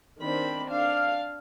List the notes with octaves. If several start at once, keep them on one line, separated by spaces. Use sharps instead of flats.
D#3 C4 D4 B5
D4 F5